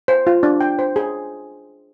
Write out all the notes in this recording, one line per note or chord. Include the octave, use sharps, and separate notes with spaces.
C5
F4
D4
G5
C5
G#4